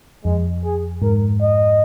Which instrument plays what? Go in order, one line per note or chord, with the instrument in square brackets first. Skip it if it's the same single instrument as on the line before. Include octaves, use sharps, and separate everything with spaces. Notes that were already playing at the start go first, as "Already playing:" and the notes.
[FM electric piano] F2 [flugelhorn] G#3
[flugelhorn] G#4
[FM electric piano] G#2 [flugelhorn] A#4
[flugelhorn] D#5